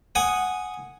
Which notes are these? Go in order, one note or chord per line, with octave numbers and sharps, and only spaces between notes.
F#5 G#5 D#6